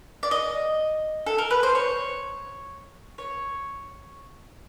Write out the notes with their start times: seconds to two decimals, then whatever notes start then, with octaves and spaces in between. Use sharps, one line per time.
0.23 D5
0.31 D#5
1.26 A4
1.38 A#4
1.51 B4
1.63 C5
1.75 C#5
3.18 C#5